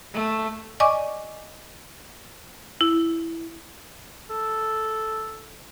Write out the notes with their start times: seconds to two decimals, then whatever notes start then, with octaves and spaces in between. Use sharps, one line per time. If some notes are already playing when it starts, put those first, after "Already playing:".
0.14 A3
0.80 D5 D#5 G#5 C#6 D6
2.81 E4
4.29 A4